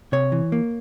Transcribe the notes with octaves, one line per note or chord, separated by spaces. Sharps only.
C3 C#5
E3
A#3